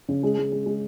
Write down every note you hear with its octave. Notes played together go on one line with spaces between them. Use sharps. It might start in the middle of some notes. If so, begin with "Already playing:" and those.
C#3
G#3
G#3
G#3
G#3